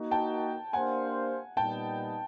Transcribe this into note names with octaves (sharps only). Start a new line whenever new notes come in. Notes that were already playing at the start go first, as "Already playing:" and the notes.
Already playing: A#3 D#4 F#4
G5 A5
A#3 D4 G4 C5 F5 F#5 G#5
A#2 G3 B3 D#4 G5 A5